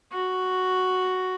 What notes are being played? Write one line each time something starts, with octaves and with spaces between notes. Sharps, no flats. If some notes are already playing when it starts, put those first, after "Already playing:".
F#4